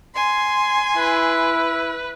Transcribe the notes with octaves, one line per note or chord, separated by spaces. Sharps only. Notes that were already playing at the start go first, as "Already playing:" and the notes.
G#5 C6
E4 B4